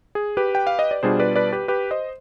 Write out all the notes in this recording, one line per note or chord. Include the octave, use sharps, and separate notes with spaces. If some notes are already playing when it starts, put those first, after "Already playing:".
G#4
G4 B4
G5
F5
D#5
D5
B2 G3 D4 F4 G#4 C5
B4 D5
B4 D5
G4 B4
G4 B4
C5 D#5